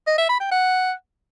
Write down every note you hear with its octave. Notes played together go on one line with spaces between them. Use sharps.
D#5
E5
B5
G5
F#5